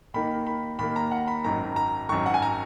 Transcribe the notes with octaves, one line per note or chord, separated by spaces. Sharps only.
D#2 D#3 A#3 B5
B5
D#2 D#3 A#3 B5
A#5
F#5
B5
G#1 F#2 D#3 A#5
A#5
G#1 F#2 D#3 C#6
F#5
G#5
A#5